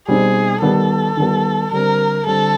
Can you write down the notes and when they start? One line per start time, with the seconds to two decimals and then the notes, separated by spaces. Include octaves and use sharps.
0.08 B2 G3 C4 D#4 G#4
0.62 D#3 G3 B3 A4
1.17 D#3 G3 B3
1.72 D3 G3 C4 A#4
2.26 D3 G3 C4 A4